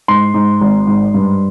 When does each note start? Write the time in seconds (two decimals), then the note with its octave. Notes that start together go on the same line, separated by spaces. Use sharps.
0.08 G#2 C6
0.34 G#2
0.61 G#1
0.87 G#2
1.14 G2